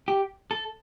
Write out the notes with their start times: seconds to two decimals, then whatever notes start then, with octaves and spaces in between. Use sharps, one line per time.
0.08 G4
0.51 A4